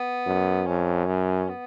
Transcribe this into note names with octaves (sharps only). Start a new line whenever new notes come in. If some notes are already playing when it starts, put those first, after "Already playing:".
Already playing: B3
F#2
F2 C#4
F#2
B3